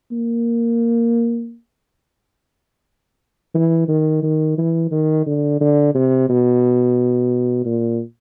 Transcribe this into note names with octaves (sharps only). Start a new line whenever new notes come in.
A#3
E3
D#3
D#3
E3
D#3
D3
D3
C3
B2
A#2